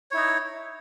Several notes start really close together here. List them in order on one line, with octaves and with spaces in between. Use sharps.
C#5 E4 D#4